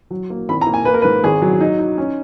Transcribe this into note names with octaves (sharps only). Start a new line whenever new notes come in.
F#3
A#3
G#1 B5
A#5
A#3
G#5
A#3 B4
A#4
B4
G#2
G#1 G#4
F#3
D#4
D#4
C#4